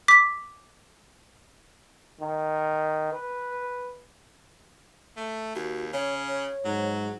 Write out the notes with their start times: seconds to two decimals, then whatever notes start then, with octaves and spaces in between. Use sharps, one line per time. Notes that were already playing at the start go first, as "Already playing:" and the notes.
0.08 D6 B6
2.21 D#3
3.12 B4
5.17 A3
5.55 D#2 F#4
5.93 C#3 C#5
6.28 C#5
6.66 G#2 F#3